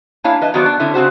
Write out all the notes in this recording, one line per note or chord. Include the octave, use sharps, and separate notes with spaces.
A#3 D4 E4 C#5 F5 G#5
E3 B4 D#5 A5
D#3 F#3 B3 F#4 C5 D5
D4
D3 C#4 E4
C#3 C4 F#4 C5